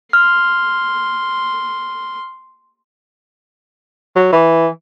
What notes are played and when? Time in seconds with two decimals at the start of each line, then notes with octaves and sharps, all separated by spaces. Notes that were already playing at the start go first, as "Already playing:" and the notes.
0.13 C6 F6
4.16 F#3
4.32 E3